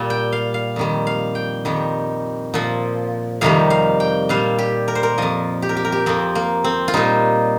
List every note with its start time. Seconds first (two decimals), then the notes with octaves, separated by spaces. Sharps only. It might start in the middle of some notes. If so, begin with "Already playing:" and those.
Already playing: A#2 G3
0.10 G5
0.32 F5
0.54 F5
0.76 F2 D#3 G3
1.07 F5
1.35 G5
1.65 F2 D#3 G3
2.54 A#2 F3
3.41 F2 C3 D#3 G3 F5
3.70 F5
4.00 G5
4.29 A#2 G3 F5
4.59 G4
4.88 A#4
4.95 C5
5.03 A#4
5.18 F2 F3 D#5
5.62 G4
5.69 A#4
5.77 G4
5.85 A#4
5.92 G4
6.06 F2 F3 C4
6.35 A#3
6.64 C4
6.88 F4
6.94 A#2 G3 D#4